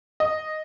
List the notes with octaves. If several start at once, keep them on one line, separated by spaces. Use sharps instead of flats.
D#5